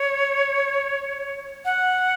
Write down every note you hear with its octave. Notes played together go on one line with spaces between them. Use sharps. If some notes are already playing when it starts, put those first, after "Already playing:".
Already playing: C#5
F#5